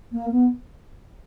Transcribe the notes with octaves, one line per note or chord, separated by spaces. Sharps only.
A#3
B3